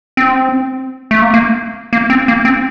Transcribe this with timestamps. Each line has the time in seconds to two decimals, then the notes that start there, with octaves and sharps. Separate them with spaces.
0.17 C4
1.11 A3
1.22 A#3
1.34 A#3
1.93 A#3
2.10 C4
2.28 A#3
2.45 C4